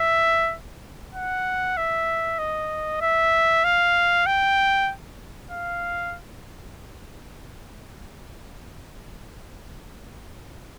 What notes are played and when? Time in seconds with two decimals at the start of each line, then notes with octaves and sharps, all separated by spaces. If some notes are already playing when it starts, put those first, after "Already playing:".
Already playing: E5
1.15 F#5
1.77 E5
2.39 D#5
3.01 E5
3.64 F5
4.27 G5
5.51 F5